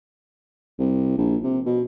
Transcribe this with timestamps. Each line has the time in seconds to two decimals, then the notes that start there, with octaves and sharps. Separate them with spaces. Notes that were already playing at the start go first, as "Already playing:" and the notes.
0.78 C2
1.17 A#1
1.43 C3
1.66 B2